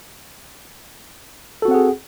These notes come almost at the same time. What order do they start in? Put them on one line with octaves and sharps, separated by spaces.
A4 F#4 C4 F#5 G#4